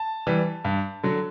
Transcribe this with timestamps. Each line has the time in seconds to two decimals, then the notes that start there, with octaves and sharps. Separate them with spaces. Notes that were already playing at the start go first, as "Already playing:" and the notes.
Already playing: A5
0.27 E3 G3
0.65 G2
1.03 D3 F#3